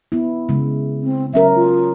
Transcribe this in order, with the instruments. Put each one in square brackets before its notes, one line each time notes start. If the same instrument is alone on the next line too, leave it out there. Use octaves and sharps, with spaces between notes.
[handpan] B3 E4
C#3 G#3
[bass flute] C4
[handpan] F#3 C#4 A#4 [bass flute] E5
[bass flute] F4